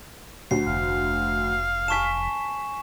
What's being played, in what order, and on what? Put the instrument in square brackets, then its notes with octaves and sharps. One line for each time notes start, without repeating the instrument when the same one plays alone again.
[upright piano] D2 [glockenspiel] C7
[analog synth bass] F1 [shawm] F5
[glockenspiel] G#5 C#6 E7 [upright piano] A5 B6